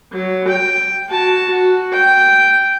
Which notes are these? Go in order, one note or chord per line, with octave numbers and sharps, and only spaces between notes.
F#3
G5
F#4 A5
F#4
G5